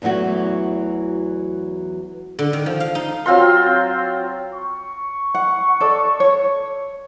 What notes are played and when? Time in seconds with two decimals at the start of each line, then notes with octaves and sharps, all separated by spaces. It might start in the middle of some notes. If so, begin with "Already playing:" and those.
0.02 E2 E3 F#3 A3 F#4
2.39 D3
2.53 D#3
2.66 F3
2.80 F5
2.95 D#4
3.26 F#3 C4 F4 C6
4.53 C#6
5.34 F#5
5.80 A4 D5
6.20 C#5